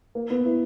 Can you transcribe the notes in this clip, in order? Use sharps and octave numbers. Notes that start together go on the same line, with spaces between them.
A#3
B3
E4